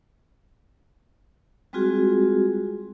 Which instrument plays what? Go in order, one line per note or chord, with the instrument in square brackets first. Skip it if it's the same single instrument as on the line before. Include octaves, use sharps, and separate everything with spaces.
[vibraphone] G3 G#3 C4 F4 F#4 G#4